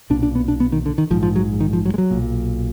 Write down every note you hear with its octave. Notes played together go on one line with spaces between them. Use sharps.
B1 A#2 D4
D4
B3
D4
B3
D#3
D3
D#3
A#1 G#2 F3
F3
F#3
D#3
F3
F#3
G#3
F#3
B1 A#2